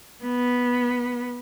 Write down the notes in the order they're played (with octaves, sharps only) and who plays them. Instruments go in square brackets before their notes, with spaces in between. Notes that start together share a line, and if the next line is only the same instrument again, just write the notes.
[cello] B3